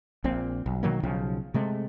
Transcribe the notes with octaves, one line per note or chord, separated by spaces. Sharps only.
A#1 A#2 C4
B1
B2 D#3 F#3 A#3
B1 C#3 F3
C3 G#3 A3